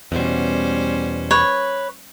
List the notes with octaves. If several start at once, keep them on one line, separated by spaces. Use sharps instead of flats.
E2 B2 G3 C#4 C5
B4 C#5